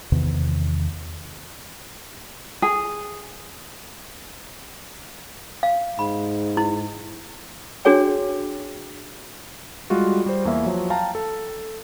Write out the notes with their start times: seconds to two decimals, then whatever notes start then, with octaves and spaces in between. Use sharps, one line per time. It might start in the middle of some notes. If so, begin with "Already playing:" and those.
0.12 E2 C3 D#3
2.62 G#4
5.63 F5
5.99 G#2 B5
6.57 E4
7.85 D4 F#4 G#4 C#5 G5
9.90 G3 G#3 F4 F#4
10.26 G3 C5
10.45 E2 A#3 E5
10.66 F3 F#3
10.90 F5 G5 A5 A#5
11.15 A4